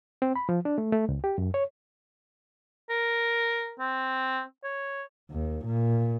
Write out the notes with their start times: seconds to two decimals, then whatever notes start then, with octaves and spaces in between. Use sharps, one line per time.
0.22 C4
0.36 B5
0.49 F3
0.65 D4
0.78 A3
0.92 A3
1.09 C#2
1.24 G4
1.38 F#2
1.54 C#5
2.90 A#4
3.80 C4
4.64 C#5
5.31 D#2
5.65 A#2